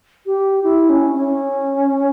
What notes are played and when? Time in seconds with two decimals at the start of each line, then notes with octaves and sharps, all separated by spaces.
0.26 G4
0.64 E4
0.89 C#4
1.14 C#4